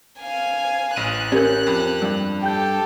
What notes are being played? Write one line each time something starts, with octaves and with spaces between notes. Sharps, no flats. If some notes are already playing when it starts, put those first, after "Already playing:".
F5 G#5
A1 F#6 D#7
C#4 G4 A#4 G6
F2
G2
G4 A4 G5 G6